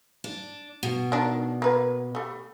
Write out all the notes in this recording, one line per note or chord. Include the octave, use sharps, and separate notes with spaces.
D4
B2
D#3 D4
A#3 B4
G3 A3